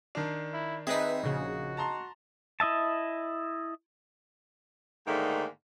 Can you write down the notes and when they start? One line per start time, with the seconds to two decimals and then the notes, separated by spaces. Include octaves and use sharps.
0.15 D#3 D4
0.53 E4
0.87 C4 D#4 G#4 B4 E5
1.23 A#1 C#3 F#4
1.77 A5 A#5 C6
2.60 E4 D#5 E5 A5
5.07 G#2 D3 D#3 A3 A#3